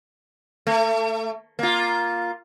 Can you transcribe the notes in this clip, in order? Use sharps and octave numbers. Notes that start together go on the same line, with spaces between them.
A3
A#3 F4